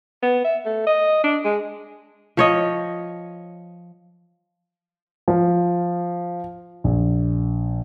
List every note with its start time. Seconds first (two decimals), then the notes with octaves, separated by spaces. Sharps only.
0.22 B3
0.44 E5
0.65 A3
0.87 D#5
1.24 D4
1.45 G#3
2.37 F3 C#5 D#5
5.28 F3
6.84 A#1